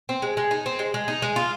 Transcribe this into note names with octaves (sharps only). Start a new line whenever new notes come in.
C4
G#3
G#3
D#4
C4
G#3
G#3
D#4
G#3
F4